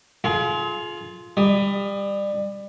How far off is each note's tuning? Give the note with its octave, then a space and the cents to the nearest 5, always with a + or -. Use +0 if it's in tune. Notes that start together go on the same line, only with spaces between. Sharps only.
F4 +0 G#4 +35 F5 +0
G3 +25 D#6 +0